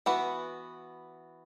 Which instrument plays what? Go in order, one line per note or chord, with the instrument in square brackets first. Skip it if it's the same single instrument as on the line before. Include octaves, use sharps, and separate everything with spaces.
[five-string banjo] E3 B3 F#4